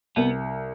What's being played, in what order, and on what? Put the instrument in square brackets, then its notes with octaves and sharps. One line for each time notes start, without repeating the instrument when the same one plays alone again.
[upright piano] C2 [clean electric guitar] B3